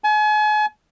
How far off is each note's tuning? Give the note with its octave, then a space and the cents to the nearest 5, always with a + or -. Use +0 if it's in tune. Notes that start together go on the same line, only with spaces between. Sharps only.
G#5 +40